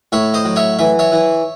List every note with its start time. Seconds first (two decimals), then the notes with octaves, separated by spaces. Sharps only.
0.12 A2 C#5 E5
0.34 C5 D#5
0.45 F#3
0.56 C#5 E5
0.79 E3 E5
0.99 C#5 E5
1.12 E3